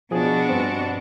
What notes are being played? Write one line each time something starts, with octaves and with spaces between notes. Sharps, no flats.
B2 F3 D4 F#4 G#4
G2 B3 C4